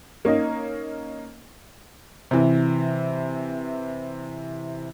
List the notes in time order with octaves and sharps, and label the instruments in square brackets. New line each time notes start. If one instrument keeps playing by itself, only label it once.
[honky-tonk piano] A#3 C#4 D#4 D#5
[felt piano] C3 E3